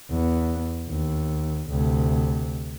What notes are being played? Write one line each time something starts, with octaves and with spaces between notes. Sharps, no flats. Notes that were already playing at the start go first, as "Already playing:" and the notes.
E2 B3
D#2
D2 C3